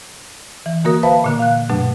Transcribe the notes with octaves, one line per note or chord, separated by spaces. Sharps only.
E3
D3 A#3 F#4 A#4 D#6
B4 C5 E5 F5 A5 B5
A#2 D3 A#3
F5 F#6
G2 B2 F#3 A3 D4